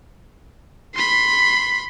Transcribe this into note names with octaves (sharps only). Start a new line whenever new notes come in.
B5 C6